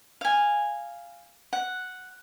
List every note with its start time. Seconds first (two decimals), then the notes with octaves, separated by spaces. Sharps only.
0.21 F5 G#5
1.53 F#5